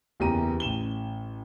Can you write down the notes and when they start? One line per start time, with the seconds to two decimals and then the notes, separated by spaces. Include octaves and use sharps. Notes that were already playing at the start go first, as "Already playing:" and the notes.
0.20 F#1 E2 G4 A#5 D#7
0.60 A1 E7 G7